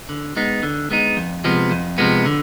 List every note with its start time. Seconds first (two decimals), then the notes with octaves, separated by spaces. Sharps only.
0.09 D3
0.36 G#3 B3 D#4
0.63 D3
0.91 G#3 B3 D#4
1.17 F2
1.44 C3 F3 G#3 B3
1.71 F2
1.98 C3 F3 G#3 B3
2.26 D3